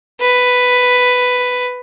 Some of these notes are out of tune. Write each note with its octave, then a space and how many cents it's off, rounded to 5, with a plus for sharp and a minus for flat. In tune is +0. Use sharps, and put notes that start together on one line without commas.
B4 +5